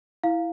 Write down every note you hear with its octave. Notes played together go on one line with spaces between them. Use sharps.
E4 F5